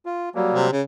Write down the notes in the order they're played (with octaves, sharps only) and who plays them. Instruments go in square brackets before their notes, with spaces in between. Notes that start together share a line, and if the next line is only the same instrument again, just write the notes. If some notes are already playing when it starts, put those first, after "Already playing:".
[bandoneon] F4
F#3 G3 A#3
[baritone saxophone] C3
C#3